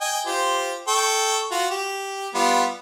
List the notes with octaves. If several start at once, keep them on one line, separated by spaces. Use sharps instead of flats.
D#5 G5 G#5
F4 G4 C5
A4 G5 C#6
F4 F#4
G4
G3 B3 F4